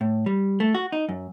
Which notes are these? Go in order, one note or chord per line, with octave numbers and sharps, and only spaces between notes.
A2
G3
A3
F#4
D#4
F#2